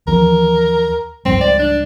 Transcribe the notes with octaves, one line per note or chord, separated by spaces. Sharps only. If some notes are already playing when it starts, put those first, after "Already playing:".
D#2 E3 F3 A#4
C#2 G#2 G3 C4
D5
D4